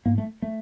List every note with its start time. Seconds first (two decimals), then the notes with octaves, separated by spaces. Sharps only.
0.05 G#2 A#3
0.18 A3
0.42 A3